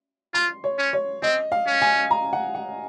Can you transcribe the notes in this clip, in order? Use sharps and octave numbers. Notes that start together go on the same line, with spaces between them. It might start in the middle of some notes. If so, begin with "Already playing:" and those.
F4 C6
C#5
C#4
C#5
C4 D#5
F5
C#4
G#5
A#5
F#5
F#5